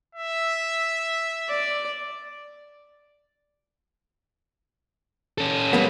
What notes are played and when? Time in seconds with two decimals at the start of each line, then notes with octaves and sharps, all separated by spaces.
0.15 E5
1.48 D5
5.38 C#4 A4
5.73 G3 A#3 B3